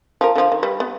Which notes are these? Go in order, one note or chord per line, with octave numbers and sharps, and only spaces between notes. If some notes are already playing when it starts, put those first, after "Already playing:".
F3 A#4
D3 F3
D#3
G3 B4
B3